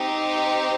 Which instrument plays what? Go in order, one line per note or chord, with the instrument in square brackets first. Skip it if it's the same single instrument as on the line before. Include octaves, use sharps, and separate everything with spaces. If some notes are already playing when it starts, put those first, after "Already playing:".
Already playing: [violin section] C4 D#4 G4